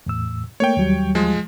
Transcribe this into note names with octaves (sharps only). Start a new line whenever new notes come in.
E2 A2 E6
A3 A#3 C#5 G5
D#2 F#3 G3
F3 G#3